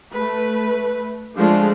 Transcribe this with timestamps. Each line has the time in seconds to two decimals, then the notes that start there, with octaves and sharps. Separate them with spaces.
0.12 A3 B4
1.36 F3 G#3 A3 D4 F4